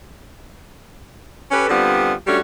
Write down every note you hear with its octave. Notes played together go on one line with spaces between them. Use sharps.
C#4 G4 A4 B4
D3 G3 B3 C4 F4
G3 A3 C#4 D4 F#4